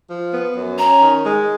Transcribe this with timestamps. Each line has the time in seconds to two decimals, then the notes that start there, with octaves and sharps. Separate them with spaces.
0.10 F3
0.33 B3
0.56 F#2
0.78 C#4 A#5
1.02 D#3
1.25 G#3